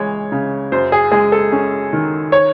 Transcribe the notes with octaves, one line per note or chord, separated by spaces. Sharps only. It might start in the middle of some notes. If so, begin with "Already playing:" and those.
Already playing: C#2 E3 G#3 C#5
C#3
F#2 C5
G#4
G#3 G#4
A4
C#4
D#3
C#5